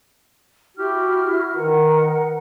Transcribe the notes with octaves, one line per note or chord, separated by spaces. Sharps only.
E4 F#4 G4 F6
D#3 A#4 B4 F#5